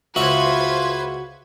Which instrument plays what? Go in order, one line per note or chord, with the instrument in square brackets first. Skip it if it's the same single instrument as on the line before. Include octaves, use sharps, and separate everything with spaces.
[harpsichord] C#2 E5 [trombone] F4 [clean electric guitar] F#4 [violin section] B4 C5 G#6